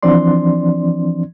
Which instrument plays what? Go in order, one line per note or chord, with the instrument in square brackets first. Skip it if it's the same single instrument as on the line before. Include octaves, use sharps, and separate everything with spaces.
[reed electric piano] E3 F3 C4 D4 D5 C6